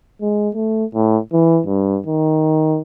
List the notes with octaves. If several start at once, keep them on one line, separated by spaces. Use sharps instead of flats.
G#3
A3
A2
E3
G2
D#3